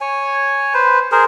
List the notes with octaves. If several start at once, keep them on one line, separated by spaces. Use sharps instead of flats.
C#5 G#5
B4 C5
G#4 A#4 C5